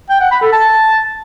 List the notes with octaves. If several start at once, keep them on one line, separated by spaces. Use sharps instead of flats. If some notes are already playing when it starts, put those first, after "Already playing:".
G5
F#5
B5
A4
A5